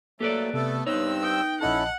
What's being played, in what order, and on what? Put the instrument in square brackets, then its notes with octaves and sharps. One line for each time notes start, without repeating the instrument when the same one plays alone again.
[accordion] F#3 A3 [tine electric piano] A#3 [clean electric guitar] G4 B4 D5 [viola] A4
[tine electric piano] C3 [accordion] A3 A4 [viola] B3
[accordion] G2 C4 E6 [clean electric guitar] D#4 B4 [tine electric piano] C#5
[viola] G5 [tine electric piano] D#6
[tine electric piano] A#1 D#5 A5 [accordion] C#4 E4 A4 [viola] F#5